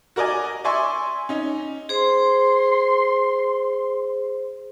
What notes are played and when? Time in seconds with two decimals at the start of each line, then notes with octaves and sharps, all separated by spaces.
0.16 F#4 A#4 D5 D#5 G#5
0.64 D5 E5 G#5 C6 C#6 E6
1.29 C#4 D#4
1.89 G#4 C5 C6